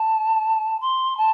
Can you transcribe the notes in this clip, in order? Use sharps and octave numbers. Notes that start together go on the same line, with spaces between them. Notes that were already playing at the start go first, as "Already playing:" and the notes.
Already playing: A5
C6
A5